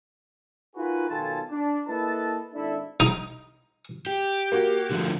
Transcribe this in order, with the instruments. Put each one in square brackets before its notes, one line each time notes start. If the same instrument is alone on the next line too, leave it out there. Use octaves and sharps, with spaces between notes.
[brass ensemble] D#4 F4 F#4 G#4 A#4 B4
B1 D#3 F4 A4 G#5 A5
D4
A#3 E4 A4 B4 D#5 A5
G#1 D4 E4 A4 E5
[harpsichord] D#4
[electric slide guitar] G4
[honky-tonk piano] A#3 F#4
[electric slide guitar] D3 F3 A3